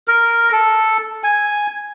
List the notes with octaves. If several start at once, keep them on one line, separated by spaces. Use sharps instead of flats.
A#4
A4
G#5